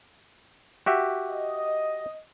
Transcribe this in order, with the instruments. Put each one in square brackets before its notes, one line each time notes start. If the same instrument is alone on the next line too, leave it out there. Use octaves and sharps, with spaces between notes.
[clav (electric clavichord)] F#4 G4 E5
[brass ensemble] D#5